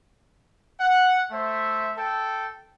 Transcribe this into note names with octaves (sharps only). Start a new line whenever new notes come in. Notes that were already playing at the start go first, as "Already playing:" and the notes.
F#5
A3 C5 E5
A4 G5